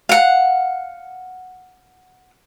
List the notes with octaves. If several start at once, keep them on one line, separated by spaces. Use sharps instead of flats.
F5 F#5